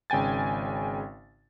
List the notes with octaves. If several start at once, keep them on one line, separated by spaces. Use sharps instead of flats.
G#1 C#3 G5 G#5 A6